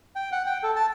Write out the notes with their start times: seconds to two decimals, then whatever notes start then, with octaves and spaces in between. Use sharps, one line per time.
0.16 G5
0.32 F#5
0.46 G5
0.63 A4
0.76 A5